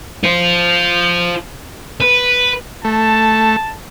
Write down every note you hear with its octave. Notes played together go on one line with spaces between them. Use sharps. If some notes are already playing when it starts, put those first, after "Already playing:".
F4 C5
B4
A3 A5